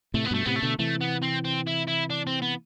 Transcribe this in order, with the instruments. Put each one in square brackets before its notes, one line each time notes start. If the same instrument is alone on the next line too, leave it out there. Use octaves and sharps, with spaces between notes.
[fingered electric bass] A2 C3 [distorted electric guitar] A3
[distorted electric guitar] B3
[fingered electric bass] G2 B2 [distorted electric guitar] A3
[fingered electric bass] A2 C3 [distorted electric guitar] B3
[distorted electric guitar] A3
[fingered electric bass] B2 D3
[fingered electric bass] C3 E3 [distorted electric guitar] A3
[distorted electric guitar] B3
C4
C4
E4
E4
D4
C4
B3